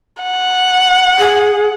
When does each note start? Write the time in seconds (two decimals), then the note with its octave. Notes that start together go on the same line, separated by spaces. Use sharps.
0.23 F#5
1.18 G#4